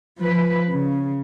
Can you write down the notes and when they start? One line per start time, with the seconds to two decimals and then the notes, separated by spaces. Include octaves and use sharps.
0.19 F3 B4
0.72 C#3